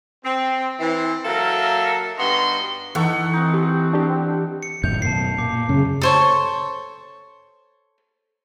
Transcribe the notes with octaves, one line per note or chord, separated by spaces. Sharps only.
C4
E3 C4
F#3 A#3 A4 A#4 E5
G2 B3 D#4 F#4 C6
E3 D#4 A4 F#5 C#6
C4 D#4
G4
D4 G4
C#7
F#2 A2 D#3 G6 F7
F#2 B2 A5 C7
A#2 D6
F#2 C#3
A4 C5 C#5